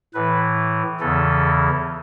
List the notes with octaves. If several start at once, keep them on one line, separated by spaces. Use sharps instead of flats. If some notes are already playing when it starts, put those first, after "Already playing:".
A2 E3 B4
E2 C#3 E3 A4